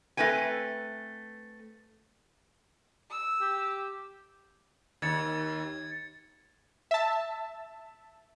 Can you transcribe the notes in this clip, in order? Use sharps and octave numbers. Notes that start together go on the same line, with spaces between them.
A3 C4 B4 G5 G#5
E6
G4
D#2 G#6 A6 C#7
E5 A5